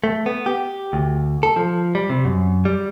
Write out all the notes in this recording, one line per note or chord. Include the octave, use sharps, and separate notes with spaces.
A3
B3
G4
D2
A4
F3
G3
C3
F#2
G3